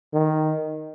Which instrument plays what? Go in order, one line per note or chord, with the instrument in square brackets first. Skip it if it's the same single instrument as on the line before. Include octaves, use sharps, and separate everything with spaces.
[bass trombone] D#3